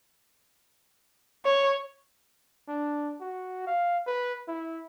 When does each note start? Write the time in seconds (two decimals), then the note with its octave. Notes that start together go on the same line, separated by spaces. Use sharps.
1.45 C#5
2.68 D4
3.21 F#4
3.67 F5
4.07 B4
4.48 E4